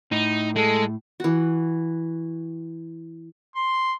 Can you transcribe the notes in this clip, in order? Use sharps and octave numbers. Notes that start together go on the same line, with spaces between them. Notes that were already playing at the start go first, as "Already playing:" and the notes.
A2 D#4
G#3 A4
E3 F#4
C6